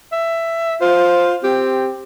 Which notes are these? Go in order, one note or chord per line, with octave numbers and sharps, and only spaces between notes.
E5
F4 C5
C4 G4